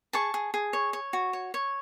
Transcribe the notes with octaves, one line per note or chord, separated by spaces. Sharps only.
G#4 A5 C#6
G#4
G#4
C#5
C#5
F#4
C#5
C#5